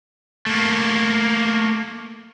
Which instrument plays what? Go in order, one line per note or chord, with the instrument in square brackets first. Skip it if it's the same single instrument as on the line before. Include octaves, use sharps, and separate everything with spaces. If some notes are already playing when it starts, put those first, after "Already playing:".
[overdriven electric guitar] A3 A#3